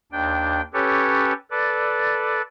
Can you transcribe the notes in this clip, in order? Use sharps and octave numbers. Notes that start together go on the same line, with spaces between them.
D#2 D4 G5
C#4 G4 A4 B4 C#5
A4 B4 D5